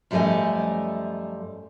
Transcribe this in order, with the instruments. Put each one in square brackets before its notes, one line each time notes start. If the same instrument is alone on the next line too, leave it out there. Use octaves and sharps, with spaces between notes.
[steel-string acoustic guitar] F#2 F3 G3 A3 D#5 G#5